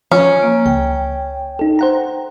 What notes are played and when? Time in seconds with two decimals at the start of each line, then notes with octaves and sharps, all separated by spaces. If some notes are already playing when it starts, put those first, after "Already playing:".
0.12 F3 C#4
0.42 A#3
0.66 C#2 G5
1.59 D#4 A4
1.79 C5 F#5 A#5